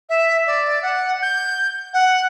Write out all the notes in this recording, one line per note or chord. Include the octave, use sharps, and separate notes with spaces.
E5
D5
F#5
G6
F#5